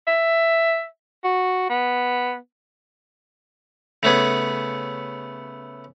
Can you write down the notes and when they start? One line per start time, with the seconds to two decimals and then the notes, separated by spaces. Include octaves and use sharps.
0.07 E5
1.24 F#4
1.69 B3
4.03 C#3 A3 B3 G#4